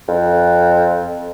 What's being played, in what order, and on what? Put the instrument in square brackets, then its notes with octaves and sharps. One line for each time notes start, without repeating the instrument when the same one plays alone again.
[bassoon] F2